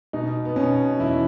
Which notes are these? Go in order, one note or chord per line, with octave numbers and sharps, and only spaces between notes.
B2 D#4
B3
B2 C#4
E2 E4